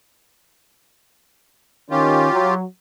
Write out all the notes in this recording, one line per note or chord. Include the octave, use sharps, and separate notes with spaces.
D#3 C#4 F4 G4
F#3